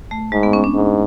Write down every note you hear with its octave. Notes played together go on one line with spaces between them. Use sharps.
A3
G#2 G#3
B3
C#4
D4
G#2